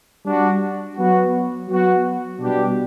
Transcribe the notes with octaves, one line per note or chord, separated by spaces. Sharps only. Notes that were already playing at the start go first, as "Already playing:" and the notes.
G3 D4 F#4
F#3 B3 F#4
F#3 B3 F#4
B2 G3 D4 G4